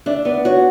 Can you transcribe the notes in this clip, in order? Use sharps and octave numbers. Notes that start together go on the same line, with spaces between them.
D4 D5 E5
B3 D5
F#4 C#5